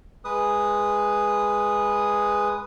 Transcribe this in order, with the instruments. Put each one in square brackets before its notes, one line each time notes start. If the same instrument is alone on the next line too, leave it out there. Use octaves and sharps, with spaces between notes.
[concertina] G#3 B4 D#6